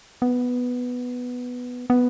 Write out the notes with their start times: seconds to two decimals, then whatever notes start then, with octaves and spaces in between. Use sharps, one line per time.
0.22 B3
1.90 B3